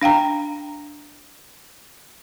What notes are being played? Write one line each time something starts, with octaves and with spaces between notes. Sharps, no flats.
D4 F5 G5 A#5